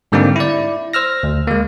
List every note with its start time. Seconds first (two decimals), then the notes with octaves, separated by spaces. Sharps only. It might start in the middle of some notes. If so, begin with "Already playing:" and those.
0.12 G#2 D3 G3 A#3 C4 D#4
0.36 E4 D5
0.93 C5 E6 F6 A#6
1.23 D2
1.48 G#3 A#3